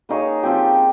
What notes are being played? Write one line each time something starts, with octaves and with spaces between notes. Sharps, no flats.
A#3 D#4 G#4 C#5
F3 C4 G4